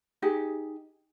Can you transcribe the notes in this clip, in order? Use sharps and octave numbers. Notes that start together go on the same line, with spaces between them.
D#4 G4 G#4